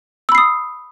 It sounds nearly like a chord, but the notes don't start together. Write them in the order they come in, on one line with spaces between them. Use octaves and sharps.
E6 B5 C7 D#6